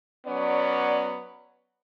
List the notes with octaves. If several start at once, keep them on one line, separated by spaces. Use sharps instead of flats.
F#3 B3 C#4 D5